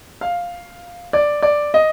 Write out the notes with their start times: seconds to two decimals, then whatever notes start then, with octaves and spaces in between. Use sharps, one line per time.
0.21 F5
1.13 D5
1.42 D5
1.74 D#5